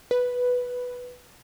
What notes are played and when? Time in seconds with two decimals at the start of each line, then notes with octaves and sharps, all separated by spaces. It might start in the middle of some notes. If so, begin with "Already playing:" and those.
0.11 B4